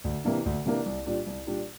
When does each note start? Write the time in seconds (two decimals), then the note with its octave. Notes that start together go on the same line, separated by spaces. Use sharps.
0.04 D2
0.24 C3 E3 A#3 D4
0.46 D2
0.66 C3 E3 A#3 D4
0.86 C2
1.06 A#2 G3 D4
1.26 C2
1.47 A#2 G3 D4